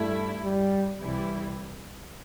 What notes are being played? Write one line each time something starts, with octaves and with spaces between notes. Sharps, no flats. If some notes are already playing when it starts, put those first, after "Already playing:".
Already playing: G2 G3 A3 E4
G3
C2 C3 E3 G3 E4